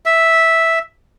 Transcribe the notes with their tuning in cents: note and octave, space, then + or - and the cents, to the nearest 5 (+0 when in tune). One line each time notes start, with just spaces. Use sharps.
E5 -5